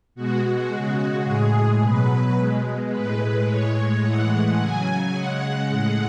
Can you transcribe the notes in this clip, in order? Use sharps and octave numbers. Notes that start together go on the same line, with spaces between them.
B2 G#3 F#4
C#3 G#3
A2 G#3 G#4
B2 F#3 B4
B2 G#3
A2 G#3 B4
A2 G#3 C#5
A2 E3 G#3 F#5
C#3 F#3 G#5
C#3 G#3 F#5
A2 G#3